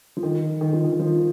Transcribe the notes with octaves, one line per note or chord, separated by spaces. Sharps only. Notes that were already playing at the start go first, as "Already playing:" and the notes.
F3
D#3
D#3
F3
D#3
F3